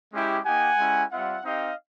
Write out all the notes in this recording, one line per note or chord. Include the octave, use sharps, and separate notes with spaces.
G#3 C#4 E4 G4
A#3 D#4 G4 F#5 G#5
G#3 C#4 E4 G4
G3 C4 F4 E5 F#5
C4 D#4 G4 D#5 F5